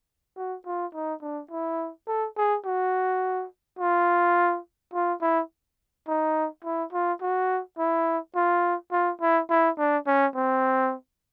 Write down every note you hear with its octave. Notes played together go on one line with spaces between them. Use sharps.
F#4
F4
D#4
D4
E4
A4
G#4
F#4
F4
F4
E4
D#4
E4
F4
F#4
E4
F4
F4
E4
E4
D4
C#4
C4